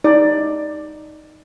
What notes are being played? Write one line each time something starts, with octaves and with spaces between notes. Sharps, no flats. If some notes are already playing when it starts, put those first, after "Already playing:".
D#4 D5